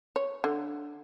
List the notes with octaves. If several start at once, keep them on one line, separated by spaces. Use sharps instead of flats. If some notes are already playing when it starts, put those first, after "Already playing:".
C#5
D3